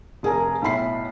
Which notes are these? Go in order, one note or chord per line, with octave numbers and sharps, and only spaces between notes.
F1 G#4 A#4 G#5 A#5
B1 A2 B5 C7